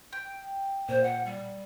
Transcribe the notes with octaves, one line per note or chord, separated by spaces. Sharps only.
G5
A#2 C5
F#5
G3